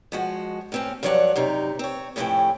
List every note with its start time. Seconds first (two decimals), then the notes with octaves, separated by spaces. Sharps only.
0.12 F3 G#3 F#4
0.72 A2 C4 C#4
1.03 G2 F3 F#3 C#5 D5 F#5
1.36 F#2 C3 D#4
1.79 C4 C#5
2.16 F2 A2 C3 C#4 E4 G5